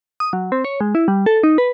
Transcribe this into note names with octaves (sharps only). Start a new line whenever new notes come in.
D#6
F#3
C4
C#5
G#3
E4
G3
A4
D#4
B4